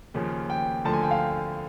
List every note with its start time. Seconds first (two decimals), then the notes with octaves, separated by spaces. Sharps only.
0.14 D#2 C#3 F3
0.50 G5
0.85 D2 D3 F3 A3 A5
0.93 G#5
1.03 G5
1.11 F5